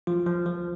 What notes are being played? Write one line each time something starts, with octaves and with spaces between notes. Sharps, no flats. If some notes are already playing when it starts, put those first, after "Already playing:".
F3 F4
F3
F3